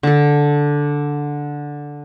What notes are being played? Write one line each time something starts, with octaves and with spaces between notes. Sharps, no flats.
D3 A4